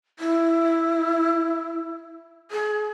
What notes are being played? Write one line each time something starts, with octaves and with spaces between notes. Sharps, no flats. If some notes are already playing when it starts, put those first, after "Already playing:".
E4
G#4